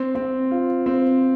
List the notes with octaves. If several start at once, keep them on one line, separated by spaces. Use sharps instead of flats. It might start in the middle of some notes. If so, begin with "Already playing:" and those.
Already playing: C4
C4
F4
C4